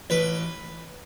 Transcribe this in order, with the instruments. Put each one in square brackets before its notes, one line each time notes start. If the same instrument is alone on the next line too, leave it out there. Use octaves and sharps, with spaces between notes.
[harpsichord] A1 B4